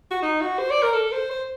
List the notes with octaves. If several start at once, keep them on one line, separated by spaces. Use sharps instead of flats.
F#4
D#4
F#4
C5
D5
A#4
A4
C5
C5